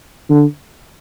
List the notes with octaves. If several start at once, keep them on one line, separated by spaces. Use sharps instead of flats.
D3